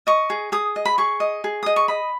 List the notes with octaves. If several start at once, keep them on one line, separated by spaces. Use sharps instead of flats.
D#5 C#6
G#4
G#4 D#6
D#5
B5
G#4 C#6
D#5
G#4
D#5 D#6
C#6
D#5 B5